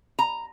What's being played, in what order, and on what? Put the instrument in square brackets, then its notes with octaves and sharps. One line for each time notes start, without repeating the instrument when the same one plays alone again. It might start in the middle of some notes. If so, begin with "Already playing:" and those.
[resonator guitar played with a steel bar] A#5